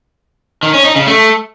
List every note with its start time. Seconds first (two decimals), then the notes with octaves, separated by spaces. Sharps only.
0.63 D#3
0.74 C#4
0.85 D#4
0.96 C#3
1.07 A3